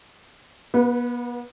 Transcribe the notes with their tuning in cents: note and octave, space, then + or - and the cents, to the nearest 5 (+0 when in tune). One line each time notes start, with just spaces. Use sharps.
B3 -40 B4 +0